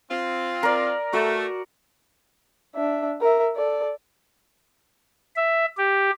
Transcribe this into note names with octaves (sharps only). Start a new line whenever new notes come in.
C4 F4
A#4 D5
A3 F#4
D4 E5
A#4 E5
A4 D5
E5
G4